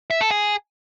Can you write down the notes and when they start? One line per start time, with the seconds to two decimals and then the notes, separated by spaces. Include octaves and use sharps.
0.10 E5
0.21 A4
0.31 G#4